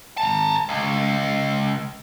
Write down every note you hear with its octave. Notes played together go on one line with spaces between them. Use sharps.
A5 A#5
C#2